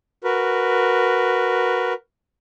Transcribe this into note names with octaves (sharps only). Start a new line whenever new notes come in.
F#4 A#4 B4